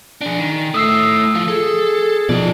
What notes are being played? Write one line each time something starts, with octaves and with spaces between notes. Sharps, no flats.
D4 G#4
D#3
A3 E4 D#6 E6 C7
F3 F4
G#4 A4
B2 F3 D#4 D5